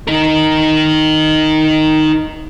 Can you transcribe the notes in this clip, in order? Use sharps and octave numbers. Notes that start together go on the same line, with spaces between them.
D#4 A#4